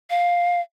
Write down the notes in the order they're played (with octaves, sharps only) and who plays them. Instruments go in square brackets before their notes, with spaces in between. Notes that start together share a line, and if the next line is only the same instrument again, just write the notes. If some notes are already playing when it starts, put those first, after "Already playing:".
[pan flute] F5